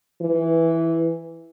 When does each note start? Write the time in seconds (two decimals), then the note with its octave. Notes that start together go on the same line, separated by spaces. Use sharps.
0.21 E3